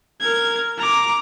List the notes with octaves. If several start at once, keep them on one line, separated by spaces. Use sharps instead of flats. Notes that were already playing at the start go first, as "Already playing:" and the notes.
A#4 G#6
A#5 D6